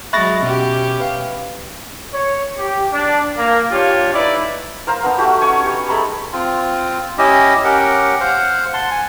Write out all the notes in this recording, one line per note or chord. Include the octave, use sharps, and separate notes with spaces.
F#3 G#3 E5 B5 C#6 F#6 A6 A#6
B2 C#4 G4
B4 F5
C#5
G4
D4
A#3
D4 F4 G4 C#5
D#4 E4 B4 D5
A#4 C5 F5 A#5
B3 D4 D#4
A3 F#4 G4
C#4 C#5 G#5
G4
G#3 A3 A#5 B5
C4 F4
C#4 E4 G4 D#5
C#4 G4 A#4 F#5
C5 F5 F#5
F#5 A5 C6
G#5